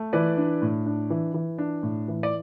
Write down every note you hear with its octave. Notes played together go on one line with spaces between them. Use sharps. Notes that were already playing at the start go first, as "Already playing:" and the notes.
Already playing: A3
E3 B4 D5
D4
A2
D4
E3
E3
D4
A2
E3
D5